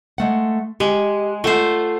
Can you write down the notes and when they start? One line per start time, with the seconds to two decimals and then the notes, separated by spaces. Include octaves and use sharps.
0.18 G#3 A3 F#5
0.80 G#3 G4
1.44 A3 F4 C5 F#5